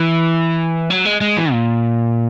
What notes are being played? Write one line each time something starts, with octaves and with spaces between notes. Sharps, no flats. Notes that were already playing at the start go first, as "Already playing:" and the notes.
Already playing: E3
F#3
G#3
G#3
E3
A#2